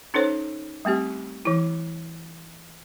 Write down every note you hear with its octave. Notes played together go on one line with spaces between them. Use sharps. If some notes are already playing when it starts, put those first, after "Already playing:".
C#4 D#4 A4 C5 C#5
G3 A3 C4 G4
E3 E4